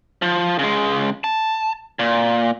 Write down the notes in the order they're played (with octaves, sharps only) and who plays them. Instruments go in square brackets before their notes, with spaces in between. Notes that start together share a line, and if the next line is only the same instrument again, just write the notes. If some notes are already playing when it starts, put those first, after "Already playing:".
[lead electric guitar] F3
C#3 G#3
A5
A#2